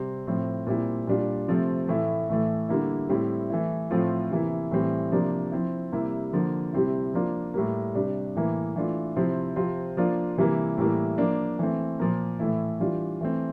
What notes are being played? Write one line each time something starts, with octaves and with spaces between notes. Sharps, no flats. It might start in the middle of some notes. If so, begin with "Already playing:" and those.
Already playing: C3 G3 C4
A2 F3 C4
A#2 G3 C4 E4
A#2 G3 D4 F4
C3 F3 A3 C4
A2 E3 A3 E4
A2 E3 A3
D3 G3 A#3 E4
A2 G3 C4 E4
E3 A3 E4
A2 F3 A3 C4 F4
C3 E3 A#3 E4
A2 E3 G3 C4
C3 F3 A#3 D4
F3 C4 E4
C3 G3 A#3 E4
D3 F3 A#3
C3 G3 C4 E4
F3 A#3 D4 F4
A2 G3 A#3
C3 G3 D4
A2 E3 A#3
E3 A3 D4 F4
C3 F3 C4 E4
C3 F3 C4 F4
F3 A#3 D4 F4
C3 E3 G3 A#3 E4
A2 E3 G3 A#3 E4
F3 A#3 D4
E3 A3 C4
A#2 F3 A#3
A2 E3 A3 E4
E3 G3 D4 F4
E3 A3 C4